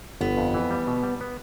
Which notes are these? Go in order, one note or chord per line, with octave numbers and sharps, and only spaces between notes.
G1 B3
F2
E3
G3
B2
G3
B3